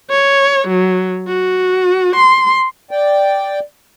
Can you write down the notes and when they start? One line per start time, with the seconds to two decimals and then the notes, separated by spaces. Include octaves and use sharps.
0.10 C#5
0.68 F#3
1.28 F#4
2.16 C6
2.91 D5 G5